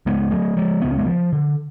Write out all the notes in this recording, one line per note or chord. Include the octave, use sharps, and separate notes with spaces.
C#2 C#3 G#3 B3
F#3 A3
F3 G#3
C#2 C#3 B3
C#4
G#3 B3
F3
D3